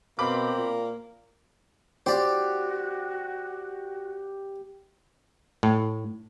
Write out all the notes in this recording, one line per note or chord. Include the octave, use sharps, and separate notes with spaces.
B2 A#3 C4 B5 D6
A#2
F#4 G4 C5 D5
A2